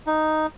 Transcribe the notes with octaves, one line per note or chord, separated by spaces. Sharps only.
D#4